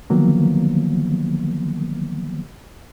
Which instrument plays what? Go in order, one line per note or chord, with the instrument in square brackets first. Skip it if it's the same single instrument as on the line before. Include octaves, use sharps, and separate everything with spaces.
[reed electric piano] D3 D#3 F3 F#3 A#3 B3